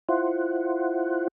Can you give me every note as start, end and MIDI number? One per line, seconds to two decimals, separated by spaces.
0.09 1.28 64
0.09 1.28 65
0.09 1.28 72
0.09 1.28 78